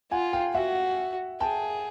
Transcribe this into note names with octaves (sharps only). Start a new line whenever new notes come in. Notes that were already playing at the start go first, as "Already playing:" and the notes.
F4 F#5 G#5
F5 G5
F#4 E5 F#5
G#4 G5 A5